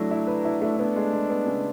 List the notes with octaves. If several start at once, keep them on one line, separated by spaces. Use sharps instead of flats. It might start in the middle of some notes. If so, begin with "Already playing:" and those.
Already playing: F#3 A3 D4 E4
E4
B4
E4
A3
B3 D4
G#3
G#3
B3
C#3